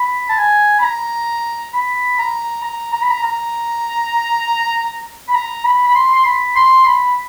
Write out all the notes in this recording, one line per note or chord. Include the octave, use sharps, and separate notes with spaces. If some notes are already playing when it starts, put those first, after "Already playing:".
Already playing: B5
A5
G#5
B5
A#5
B5
A#5
A#5
A#5
B5
A#5
A#5
B5
A#5
B5
B5
C6
C6
B5
C6
B5